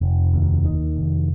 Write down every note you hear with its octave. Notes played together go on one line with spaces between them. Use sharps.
F1
D#2
D#3
F1